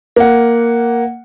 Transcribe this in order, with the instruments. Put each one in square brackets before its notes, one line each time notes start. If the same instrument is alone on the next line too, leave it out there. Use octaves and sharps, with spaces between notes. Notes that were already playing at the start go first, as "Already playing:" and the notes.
[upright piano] A#3 F#5